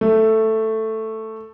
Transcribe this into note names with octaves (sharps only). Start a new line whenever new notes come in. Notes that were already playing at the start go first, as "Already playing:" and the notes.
A3